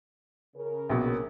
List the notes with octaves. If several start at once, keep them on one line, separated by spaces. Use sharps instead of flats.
C#3 A#4
A#1 B2